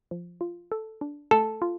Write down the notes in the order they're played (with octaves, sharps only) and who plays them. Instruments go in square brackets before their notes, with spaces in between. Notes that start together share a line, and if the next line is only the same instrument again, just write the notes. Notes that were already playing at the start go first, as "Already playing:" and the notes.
[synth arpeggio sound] F3
F4
A4
D4
[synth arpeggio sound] A3 [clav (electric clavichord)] A4
[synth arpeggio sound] F4